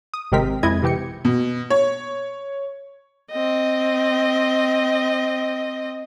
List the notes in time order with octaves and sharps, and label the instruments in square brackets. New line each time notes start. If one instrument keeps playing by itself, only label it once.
[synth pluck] D#6
G#1 C3 G#3 C4 A#4 B6
F2 G#3 E4 D#5 G#6
C3 E3 G4 G5 C#7
[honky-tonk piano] B2
C#5
[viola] C4 D#5